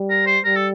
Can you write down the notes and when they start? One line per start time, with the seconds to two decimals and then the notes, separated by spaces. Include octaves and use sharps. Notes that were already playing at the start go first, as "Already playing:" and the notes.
Already playing: G3
0.10 A#4
0.26 C5
0.44 G3 A#4
0.56 A4